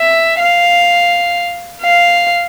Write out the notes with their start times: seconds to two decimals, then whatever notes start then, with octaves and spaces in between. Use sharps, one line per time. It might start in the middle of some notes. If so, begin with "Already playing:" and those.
Already playing: E5
0.39 F5
1.81 F5